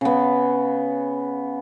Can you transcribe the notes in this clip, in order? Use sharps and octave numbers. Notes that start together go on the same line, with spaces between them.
C#3 B3